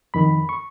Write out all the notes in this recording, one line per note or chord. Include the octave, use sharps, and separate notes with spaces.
F2 D#3 B5
C#6